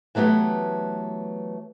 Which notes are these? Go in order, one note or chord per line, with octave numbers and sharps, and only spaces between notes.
E3 F#3 A3 B3 G4